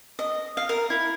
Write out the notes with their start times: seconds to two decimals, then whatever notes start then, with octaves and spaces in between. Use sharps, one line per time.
0.19 D#5
0.57 F5
0.69 A#4
0.90 E4